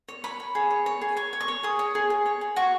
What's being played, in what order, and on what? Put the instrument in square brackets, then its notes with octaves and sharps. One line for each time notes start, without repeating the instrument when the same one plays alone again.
[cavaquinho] C#5
C#5 B5
C#5
G#4
C#5
C#5
G#4
C#5 C#6
C#5
C#6
C#5
G#4 D#6
C#5
G#4
G#4
C#5
G#4
F#4 C#6